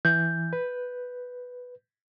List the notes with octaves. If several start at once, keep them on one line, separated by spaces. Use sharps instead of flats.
E3 G6
B4